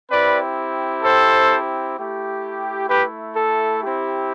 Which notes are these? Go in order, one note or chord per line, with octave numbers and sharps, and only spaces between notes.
C4 E4 G4 B4 D5
A4 C5
A3 E4 G4
G4 B4
A4
C4 E4 G4